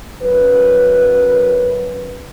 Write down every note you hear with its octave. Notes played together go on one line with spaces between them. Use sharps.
F#2 B4